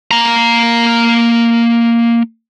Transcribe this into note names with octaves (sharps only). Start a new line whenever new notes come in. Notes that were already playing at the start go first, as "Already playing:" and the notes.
A#3 A#5